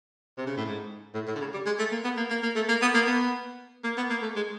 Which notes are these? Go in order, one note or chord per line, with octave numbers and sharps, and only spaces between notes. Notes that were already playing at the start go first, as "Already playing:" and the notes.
C3
C#3
A2
G#2
A2
A2
D3
C#3
G3
G#3
A3
A#3
B3
A#3
A#3
A#3
A3
A#3
B3
A#3
B3
A#3
B3
A#3
A3
G#3